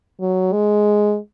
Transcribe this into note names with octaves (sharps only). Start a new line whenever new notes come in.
F#3
G#3